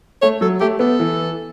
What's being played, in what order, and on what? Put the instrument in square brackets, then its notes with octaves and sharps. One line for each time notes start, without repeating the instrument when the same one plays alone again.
[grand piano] A3 [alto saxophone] C#5
[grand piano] F#3 [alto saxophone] A4
[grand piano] A3 [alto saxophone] G4
[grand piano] B3 [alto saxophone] A4
[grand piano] E3